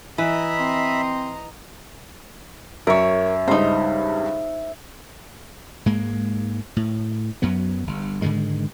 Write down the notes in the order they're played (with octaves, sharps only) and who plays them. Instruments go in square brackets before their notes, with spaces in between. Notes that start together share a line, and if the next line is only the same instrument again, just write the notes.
[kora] E3 [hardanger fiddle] D#5 A#5 [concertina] E5 B5
[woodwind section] C4 C6
[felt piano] F#2 [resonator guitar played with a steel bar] A#4 C#5 [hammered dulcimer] E5
[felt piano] C#2 G2 [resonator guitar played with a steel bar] D#4 C5
[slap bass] G#2 G#3 A#3
A2
F#2 F#3 B3
G1
G#2 D3 D#3 G#3